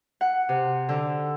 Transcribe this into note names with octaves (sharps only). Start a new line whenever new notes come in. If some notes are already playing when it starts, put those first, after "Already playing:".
F#5
C3
D3